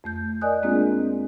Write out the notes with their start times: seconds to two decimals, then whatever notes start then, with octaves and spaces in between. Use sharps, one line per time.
0.04 F2 A3 G6
0.42 A#4 D5 D#5 G#5 D#6 F#6
0.63 G#3 A#3 C4 D4 F4 G#4